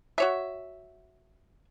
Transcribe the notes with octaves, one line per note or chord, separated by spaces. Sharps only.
F#4 C#5 E5